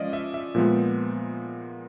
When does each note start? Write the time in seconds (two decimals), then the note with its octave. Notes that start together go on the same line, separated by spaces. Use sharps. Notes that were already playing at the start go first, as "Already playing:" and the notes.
Already playing: F3 G#3 C#4 D5 D#5 F5
0.13 E5
0.34 E5
0.55 A#2 F3 G#3 B3